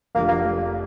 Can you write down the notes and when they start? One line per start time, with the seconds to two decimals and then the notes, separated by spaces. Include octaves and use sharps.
0.15 F1 F2 D3 F3 A3 A#3
0.28 A#3